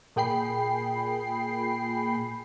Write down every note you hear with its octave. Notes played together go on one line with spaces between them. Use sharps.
A#2 G#4 G5 B5 C7